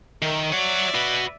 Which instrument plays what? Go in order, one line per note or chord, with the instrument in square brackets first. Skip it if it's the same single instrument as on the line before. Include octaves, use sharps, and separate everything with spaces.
[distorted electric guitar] D#3 [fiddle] A#4 E5
[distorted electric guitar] C#5 F#5 [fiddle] D5 E5
[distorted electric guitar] F#4 B4